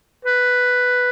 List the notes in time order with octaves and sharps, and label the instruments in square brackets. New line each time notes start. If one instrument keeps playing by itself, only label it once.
[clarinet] B4